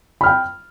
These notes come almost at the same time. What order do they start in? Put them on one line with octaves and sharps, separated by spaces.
B5 F6 G5